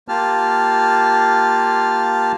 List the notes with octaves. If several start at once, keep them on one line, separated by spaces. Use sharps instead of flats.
A#3 F4 G4 A5 F6